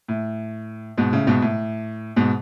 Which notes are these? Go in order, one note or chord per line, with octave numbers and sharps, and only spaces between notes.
A2
G#2 B2
A2 C#3
G#2 B2
A2
G#2 B2